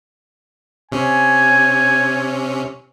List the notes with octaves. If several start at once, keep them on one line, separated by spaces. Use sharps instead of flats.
C3 C#4 G#5